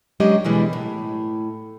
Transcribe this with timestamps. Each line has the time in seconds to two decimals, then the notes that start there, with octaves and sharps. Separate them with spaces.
0.20 F#3 G#3 C#4 D4 G4 D#5
0.44 B2 D3 E3 G3 G#3
0.73 A2